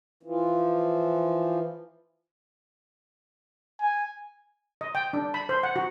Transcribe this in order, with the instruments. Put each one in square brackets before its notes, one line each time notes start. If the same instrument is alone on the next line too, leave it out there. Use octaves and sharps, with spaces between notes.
[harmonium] E3 F3
[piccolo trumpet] G#5
[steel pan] D#5
G5
D4
B5
C5
F#5
F#4